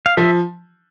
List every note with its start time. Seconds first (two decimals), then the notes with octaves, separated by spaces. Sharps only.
0.06 F5
0.17 F3 E5